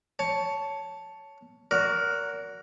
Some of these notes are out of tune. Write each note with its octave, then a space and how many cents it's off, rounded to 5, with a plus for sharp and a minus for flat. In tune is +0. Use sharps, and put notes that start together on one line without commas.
C#5 +10 A5 +0
F#4 -5 A#4 +0 D5 -40